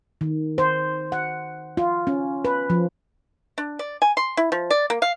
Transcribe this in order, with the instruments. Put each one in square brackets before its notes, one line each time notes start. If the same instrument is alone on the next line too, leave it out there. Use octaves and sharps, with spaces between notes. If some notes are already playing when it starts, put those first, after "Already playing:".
[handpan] D#3
C5
F#5
F4
C#4
B4
F3
[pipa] D4
D5
G#5
C6
E4
F3
D5
A#3
F5